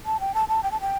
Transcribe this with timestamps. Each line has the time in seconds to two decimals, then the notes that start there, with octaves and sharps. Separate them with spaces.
0.06 A5
0.20 G5
0.34 A5
0.48 A5
0.63 G5
0.71 A5
0.81 G5